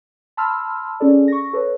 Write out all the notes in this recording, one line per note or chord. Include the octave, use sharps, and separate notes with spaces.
A5 B5 C6 E6 F6
C#4 G#4 A4 D5
C#6 A#6
A4 B4 C#5